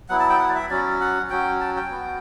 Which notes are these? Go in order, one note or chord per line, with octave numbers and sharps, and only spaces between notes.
F#3 B3 E4 F#5
A5
G5
F#5
D5
E5
F#3 C#4 F#4 D5
F#5
F#3 C#4 F#4 G5
A5
G5
B3 F#4